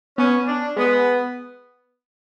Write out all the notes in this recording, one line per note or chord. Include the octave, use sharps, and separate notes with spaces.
B3 C#4
D4
G#3 B3